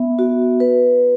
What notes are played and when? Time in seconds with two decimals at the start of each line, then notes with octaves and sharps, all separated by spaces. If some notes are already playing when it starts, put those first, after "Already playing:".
Already playing: B3 E5
0.19 F#4
0.60 B4